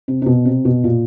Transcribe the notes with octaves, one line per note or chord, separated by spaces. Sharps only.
C3
C3
B2
C3
B2
A#2